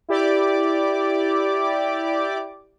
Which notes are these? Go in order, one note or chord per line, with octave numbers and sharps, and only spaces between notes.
E4 G4 D5 D6